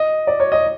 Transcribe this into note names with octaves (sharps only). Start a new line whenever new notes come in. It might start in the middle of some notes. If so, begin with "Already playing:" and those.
Already playing: D#5
D5
C#5
D#5